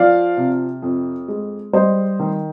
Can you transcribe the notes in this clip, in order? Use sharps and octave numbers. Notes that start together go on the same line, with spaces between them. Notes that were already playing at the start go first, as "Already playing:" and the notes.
Already playing: F3 D5 F5
C3
F2
G#3
G3 C5 D#5
D#3